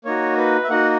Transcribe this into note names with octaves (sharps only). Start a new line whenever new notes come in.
A#3 D#4 F#4 C#5
B4
E5
A#3 D#4 F#4 F#5